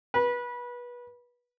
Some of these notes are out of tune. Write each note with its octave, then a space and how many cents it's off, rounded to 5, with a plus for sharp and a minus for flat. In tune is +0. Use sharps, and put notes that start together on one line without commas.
B4 -25